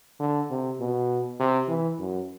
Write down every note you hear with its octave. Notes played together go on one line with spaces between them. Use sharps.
D3
C3
B2
C3
E3
F#2